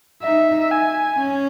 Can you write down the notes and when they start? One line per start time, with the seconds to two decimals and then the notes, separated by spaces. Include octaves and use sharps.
0.23 D#4 E5
0.71 G#5
1.19 C#4